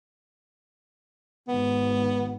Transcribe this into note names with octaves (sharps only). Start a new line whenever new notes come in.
G#1 B3